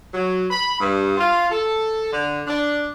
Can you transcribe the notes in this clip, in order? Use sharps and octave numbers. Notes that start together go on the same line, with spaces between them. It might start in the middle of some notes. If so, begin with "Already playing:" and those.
F#3
B5
G2
F4
A4
D3
D4